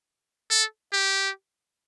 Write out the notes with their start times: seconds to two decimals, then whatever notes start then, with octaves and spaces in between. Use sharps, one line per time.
0.51 A4
0.93 G4